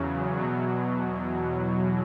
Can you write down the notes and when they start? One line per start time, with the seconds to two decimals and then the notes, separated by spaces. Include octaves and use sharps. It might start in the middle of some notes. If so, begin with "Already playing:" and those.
Already playing: E2 C#3 F#3
0.37 E2 B2 F#3